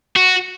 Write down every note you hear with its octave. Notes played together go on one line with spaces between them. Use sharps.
F#4